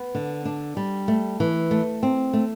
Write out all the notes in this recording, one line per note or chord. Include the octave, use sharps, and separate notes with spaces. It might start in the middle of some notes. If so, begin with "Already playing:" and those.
Already playing: B3
D3
D4
G3
A3
E3
A3
C4
A3